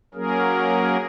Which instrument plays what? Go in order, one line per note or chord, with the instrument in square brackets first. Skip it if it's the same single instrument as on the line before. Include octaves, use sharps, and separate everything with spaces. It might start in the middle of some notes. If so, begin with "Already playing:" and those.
[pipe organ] F#3 A#3 C#4 G#4 A#4